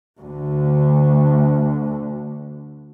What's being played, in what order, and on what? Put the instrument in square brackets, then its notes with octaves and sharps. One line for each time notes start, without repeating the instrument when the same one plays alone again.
[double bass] D2 D3